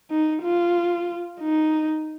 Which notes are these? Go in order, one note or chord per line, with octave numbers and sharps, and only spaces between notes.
D#4
F4
D#4